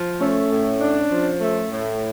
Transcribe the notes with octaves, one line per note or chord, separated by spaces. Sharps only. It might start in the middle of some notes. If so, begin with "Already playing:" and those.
Already playing: F3
A3 C#4
A2
D4
F3
A3
A2